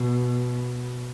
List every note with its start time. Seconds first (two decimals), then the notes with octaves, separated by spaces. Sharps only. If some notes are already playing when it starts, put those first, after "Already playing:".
Already playing: B2